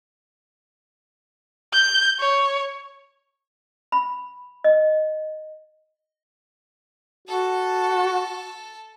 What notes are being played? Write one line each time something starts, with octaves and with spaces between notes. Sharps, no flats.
G6
C#5
B5
D#5
F#4 A4 A5